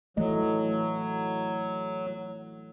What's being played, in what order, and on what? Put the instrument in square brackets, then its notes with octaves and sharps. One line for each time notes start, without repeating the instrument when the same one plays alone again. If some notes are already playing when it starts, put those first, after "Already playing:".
[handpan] E3 A3 D#5 [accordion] F#3